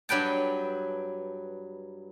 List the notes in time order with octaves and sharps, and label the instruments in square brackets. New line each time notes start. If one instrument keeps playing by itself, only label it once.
[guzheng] G2 F#3 B4 G5 A5